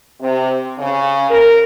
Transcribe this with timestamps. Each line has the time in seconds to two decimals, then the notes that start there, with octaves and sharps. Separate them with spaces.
0.20 C3
0.79 C#3
1.29 A#4